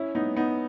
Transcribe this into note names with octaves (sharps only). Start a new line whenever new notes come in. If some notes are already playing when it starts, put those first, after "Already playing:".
Already playing: C#4 E4
B3 D#4
B3 D#4